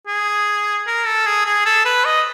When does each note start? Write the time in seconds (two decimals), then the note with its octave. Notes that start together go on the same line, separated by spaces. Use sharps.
0.07 G#4
0.87 A#4
1.06 A4
1.26 G#4
1.46 G#4
1.66 A4
1.85 B4
2.05 D#5